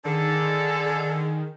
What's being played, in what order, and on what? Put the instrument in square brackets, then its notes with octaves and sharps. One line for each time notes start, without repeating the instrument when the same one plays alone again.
[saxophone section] D3 [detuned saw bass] D#3 [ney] G#4 [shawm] A4